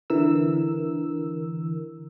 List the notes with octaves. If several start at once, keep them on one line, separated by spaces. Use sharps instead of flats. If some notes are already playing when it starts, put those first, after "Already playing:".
D3 E3 A#4 E6